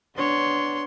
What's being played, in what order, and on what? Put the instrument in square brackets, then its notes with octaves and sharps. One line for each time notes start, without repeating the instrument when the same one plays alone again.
[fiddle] B3 C6 [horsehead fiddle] D4 C#5